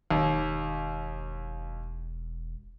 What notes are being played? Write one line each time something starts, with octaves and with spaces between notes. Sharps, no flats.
E1 D#2